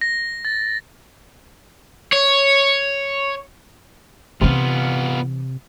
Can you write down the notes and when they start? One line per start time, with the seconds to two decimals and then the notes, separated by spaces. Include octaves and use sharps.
0.01 A#6
0.45 A6
2.13 C#5
4.41 C3 E3 B3 D#4 F4